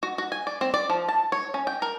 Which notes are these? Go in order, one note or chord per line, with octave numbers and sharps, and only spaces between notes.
F#4
F#4
G#5
D5
C4
D5
F3
A5
C#5
C#4
G5
A#4